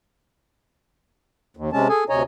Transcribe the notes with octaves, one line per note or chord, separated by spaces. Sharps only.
D#2
C3 G#3 C#4 A5
G#4 A4 G#5
D2 C3 C#5 D#5 G#5 A#5